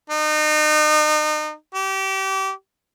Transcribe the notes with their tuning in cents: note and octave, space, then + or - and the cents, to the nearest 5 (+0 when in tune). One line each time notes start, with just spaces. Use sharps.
D#4 -35
G4 -30